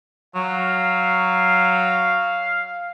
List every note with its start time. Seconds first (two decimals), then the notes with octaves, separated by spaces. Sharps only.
0.35 F#3 F5